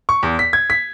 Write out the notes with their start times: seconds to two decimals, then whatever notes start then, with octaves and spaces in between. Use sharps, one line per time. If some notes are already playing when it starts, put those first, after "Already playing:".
0.09 C#6
0.23 E2
0.39 B6
0.53 G#6
0.70 B6